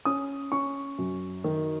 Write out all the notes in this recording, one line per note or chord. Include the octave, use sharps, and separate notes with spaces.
C#4 D#6
C#4 C#6
F#2
D#3